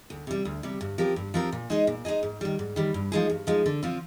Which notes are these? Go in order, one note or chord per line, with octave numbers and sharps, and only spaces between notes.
D2
C3 G3
D2
C3 G3
G2
F3 C4 G4 A#4
G2
F3 C4 G4 A#4
A#2
G#3 D#4 G#4 D#5
A#2
G#3 D#4 G#4 D#5
G#2
D#3 G3
G#2
D#3 G3
G2
F3 G#3 D#4 G#4
G2
F3 G#3 D#4 G#4
D3
F3 C4 F4